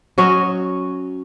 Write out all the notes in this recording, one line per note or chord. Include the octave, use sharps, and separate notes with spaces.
F#3 C#4 F#4 D#5